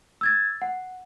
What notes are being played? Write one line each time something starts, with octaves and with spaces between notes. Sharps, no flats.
E6 G#6 A6
F#5